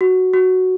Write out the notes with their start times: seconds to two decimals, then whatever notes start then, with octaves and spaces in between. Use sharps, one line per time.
0.01 F#4
0.34 F#4